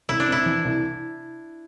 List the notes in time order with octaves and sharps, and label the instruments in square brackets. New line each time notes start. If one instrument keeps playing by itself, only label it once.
[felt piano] C2 [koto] E4
[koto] D4
[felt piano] C3 [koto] E4
[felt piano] E3
C2